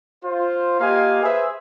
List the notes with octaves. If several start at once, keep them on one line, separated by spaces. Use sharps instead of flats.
F4 C5
A#3 F4 G4 D#5 F5 G#5
G#4 B4 C5 E5